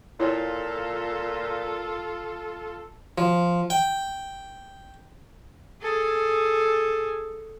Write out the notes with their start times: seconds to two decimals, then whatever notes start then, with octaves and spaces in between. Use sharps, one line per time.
0.20 A#2 E4 F4 A4 C#5
3.18 F3
3.70 G5
5.82 G#4 A4